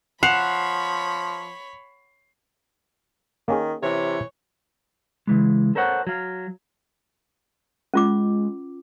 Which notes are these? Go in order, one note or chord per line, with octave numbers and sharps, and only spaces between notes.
F3 C#5 F#5 B5 C7 E7 F7
D#3 A#3 C#4 G#4
C3 E3 C#5
C#3 E3 G#3
A4 A#4 C5 C#5 F#5
F#3 F5
G#3 C#4 F4 D6